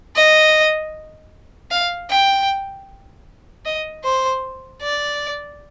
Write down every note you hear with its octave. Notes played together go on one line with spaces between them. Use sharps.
D#5
F5
G5
D#5
C5
D5